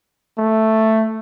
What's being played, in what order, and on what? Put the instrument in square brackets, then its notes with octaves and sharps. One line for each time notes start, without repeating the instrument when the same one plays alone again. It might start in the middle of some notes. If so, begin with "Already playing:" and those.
[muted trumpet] A3